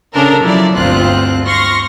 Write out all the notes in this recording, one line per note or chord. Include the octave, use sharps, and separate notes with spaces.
C#3 C#4 D4 A4 A#4
F3 F#3 E4 D5
G1 D2 C4 F4 F#6
C6 C#6 F6 A#6